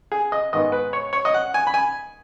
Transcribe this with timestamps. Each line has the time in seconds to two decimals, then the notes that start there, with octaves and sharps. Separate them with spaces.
0.12 G#4
0.32 D#5
0.53 G#2 D#3 B3 D#5
0.72 B4
0.93 C#5
1.13 C#5
1.25 D#5
1.34 F#5
1.54 G#5
1.67 B5
1.74 G#5